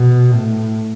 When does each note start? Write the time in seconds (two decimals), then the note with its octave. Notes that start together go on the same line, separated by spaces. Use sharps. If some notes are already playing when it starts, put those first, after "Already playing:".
Already playing: B2
0.32 A2